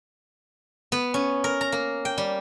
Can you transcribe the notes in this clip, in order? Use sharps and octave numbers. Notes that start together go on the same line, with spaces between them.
B3
C#4
A#4
A#5
A#3
G5
G3